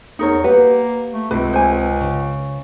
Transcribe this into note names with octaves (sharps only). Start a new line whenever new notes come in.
E2 D#4 A#4 C#5
A#3 G4 B4 F#5
A3
C#2 C3 B4
C5 G#5
C#3